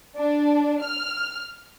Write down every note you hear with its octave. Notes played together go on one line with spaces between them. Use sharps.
D4
F6